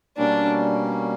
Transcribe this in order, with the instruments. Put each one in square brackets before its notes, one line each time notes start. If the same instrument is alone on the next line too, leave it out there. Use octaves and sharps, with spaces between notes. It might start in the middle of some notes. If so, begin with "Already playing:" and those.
[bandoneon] B2 G3 A#3 C#4 [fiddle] D4